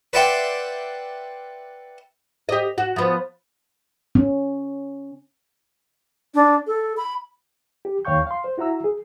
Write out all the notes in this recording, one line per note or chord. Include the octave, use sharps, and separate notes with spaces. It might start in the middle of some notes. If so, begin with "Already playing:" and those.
B4 D5 E5 F#5 G5 C6
G4 D#5
F#4
F3 B3
C#4
D4
A4
B5
G4
D#2 C#5 F5 G5 C#6 G6
F5 C6
C5
E4 F#4 E5 A#5 E6
G#4